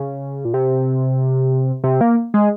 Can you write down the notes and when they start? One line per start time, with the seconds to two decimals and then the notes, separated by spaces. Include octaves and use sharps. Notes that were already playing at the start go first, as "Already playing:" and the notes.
Already playing: C#3
0.45 A#2
0.54 C3
1.84 C3
2.01 A#3
2.34 G#3